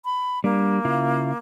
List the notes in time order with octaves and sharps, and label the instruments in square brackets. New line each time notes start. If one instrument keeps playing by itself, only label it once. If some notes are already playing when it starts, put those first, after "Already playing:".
[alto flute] B5
[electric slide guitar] G3 D4 [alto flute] A#3
[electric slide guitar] C#3 E4 F4